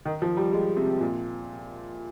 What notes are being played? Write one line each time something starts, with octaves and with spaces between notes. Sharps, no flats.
D#3
F3
G3
G#3
C3
A#2